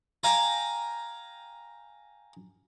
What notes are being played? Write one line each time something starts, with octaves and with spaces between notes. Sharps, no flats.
F5 G5 G#5 A#5